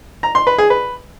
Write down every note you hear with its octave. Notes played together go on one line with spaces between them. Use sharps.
A#5
C6
B4
G#4
B4